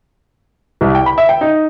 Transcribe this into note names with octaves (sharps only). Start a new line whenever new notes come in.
C2
G5
B5
E5
G5
D#4